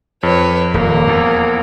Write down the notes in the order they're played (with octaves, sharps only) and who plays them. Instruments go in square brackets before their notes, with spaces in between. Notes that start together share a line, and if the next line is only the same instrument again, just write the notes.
[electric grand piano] F2 [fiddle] B4 C#5
[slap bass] D#1 [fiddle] A#3
[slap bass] E2